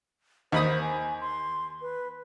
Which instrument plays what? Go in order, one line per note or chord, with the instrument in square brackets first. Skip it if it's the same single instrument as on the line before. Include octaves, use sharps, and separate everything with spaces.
[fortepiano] D#2 B5 D#6 [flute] C5
[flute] G#5
C6
B4